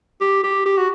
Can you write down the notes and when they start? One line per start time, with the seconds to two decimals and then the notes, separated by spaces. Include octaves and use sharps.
0.21 G4
0.43 G4
0.66 G4
0.78 F#4